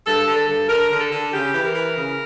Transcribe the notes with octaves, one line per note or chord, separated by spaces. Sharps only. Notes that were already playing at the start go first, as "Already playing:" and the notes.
G2 A4
D3
A4
G2
D3 A#4
D3
A4
D3
C#3 G4
E3
A#4
E3
C#3